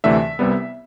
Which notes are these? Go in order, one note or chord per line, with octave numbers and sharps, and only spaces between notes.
D2 C3 E3 A3 D4 E5
C2 C3 G3 B3